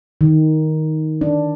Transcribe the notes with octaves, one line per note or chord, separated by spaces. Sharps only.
D#3
D4